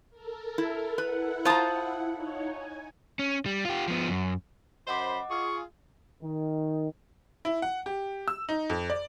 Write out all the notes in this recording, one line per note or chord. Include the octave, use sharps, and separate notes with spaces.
A4 A#4
E4
E4 B4 F#5
F4 C5 A5 A#5 D#6
D#4 C#5
G#5
C#4
G3
F4 G4
F3 B3
F#2
F#2 C5 D#5 F#5 B5 D6
F4 G#4 C#6
D#3
E4
F#5
G4
E6
D#4
F2
D5